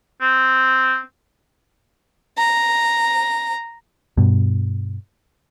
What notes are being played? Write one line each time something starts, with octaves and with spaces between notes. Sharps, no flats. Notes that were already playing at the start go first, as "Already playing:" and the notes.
C4
A#5
G2 B2